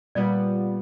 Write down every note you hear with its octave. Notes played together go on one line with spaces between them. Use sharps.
A#2 G3 B3 D5